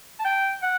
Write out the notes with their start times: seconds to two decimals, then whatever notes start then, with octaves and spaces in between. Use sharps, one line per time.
0.19 A5
0.25 G5
0.62 F#5